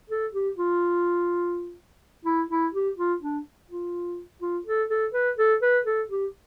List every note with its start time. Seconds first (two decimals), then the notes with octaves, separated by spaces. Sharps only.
0.10 A4
0.33 G4
0.57 F4
2.25 E4
2.50 E4
2.73 G4
2.97 F4
3.22 D4
3.70 F4
4.41 F4
4.66 A4
4.89 A4
5.13 B4
5.38 A4
5.62 B4
5.85 A4
6.09 G4